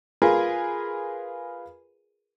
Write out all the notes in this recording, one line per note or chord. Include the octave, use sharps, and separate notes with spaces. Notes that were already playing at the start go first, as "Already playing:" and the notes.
F4 G#4 A#4 B4